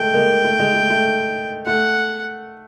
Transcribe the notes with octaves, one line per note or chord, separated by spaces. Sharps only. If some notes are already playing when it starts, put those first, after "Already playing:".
Already playing: G#3 A3 G5
G#3 A#3
A3
G#3
A3
A3
A3 F#5